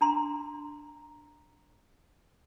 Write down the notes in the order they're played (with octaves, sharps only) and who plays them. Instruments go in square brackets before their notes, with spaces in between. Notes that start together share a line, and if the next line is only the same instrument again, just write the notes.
[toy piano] D4 A#5 C6